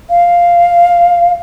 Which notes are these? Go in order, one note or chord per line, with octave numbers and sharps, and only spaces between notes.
F5